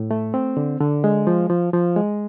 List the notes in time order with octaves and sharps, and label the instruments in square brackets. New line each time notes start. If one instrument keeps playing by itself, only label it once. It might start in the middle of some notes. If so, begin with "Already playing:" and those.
Already playing: [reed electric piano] A2
A3
C4
D3
D3
G#3
F3
F3
F3
G#3